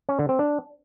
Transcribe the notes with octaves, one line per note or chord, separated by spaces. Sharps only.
C#4
D3
C4
D4